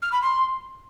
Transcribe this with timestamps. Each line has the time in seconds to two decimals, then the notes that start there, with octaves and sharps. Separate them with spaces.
0.02 F6
0.12 B5
0.21 C6